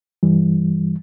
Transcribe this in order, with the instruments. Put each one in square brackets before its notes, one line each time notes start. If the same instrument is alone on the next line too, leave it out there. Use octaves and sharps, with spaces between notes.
[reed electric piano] G2 E3 G3